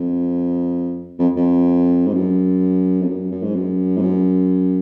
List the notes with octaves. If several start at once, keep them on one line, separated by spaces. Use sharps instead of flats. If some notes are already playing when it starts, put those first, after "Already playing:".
Already playing: F2
F2
F2
G#2
F#2
F2
F#2
F#2
G#2
F#2
G#2
F#2